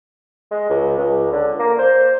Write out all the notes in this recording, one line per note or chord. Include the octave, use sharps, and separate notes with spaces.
G#3
C#2
C#2
D3
A#3
C5